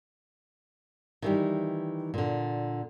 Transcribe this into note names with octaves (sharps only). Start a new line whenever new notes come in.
D#3 E3 G3
A#2 D3